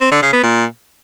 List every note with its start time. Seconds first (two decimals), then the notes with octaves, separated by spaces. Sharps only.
0.01 C4
0.11 D3
0.22 C#3
0.33 B3
0.43 A#2